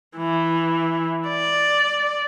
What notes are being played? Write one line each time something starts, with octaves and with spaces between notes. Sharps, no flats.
E3
D5